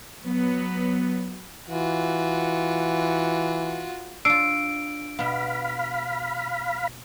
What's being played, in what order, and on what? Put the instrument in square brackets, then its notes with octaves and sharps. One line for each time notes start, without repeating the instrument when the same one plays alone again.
[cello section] F#3 B3
[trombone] E3 [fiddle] F4 F#4
[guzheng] D4 F4 [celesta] E6 C7 [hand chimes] D7
[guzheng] B2 B3 [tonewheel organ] F5 B5